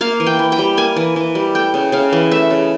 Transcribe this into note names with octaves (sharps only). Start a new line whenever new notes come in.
A#3 F5
E3
G5
E3
G5
G3
A#3 G#5
E3
E3
G3
A3 G5
C#3
C#3 F5
E3
A3 E5
C#3